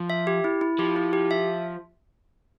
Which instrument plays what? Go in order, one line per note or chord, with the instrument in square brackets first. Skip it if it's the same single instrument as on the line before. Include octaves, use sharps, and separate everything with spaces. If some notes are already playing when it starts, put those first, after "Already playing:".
Already playing: [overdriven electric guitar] F3
[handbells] E5
G4
E4
E4
[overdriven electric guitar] F3 [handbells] G4
[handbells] E4
G4
E5